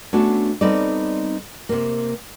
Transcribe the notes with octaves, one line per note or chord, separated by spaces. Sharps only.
A3 B3 C#4 D4 F#4
G3 B3 C4 D#4 A4 D5
C3 A#3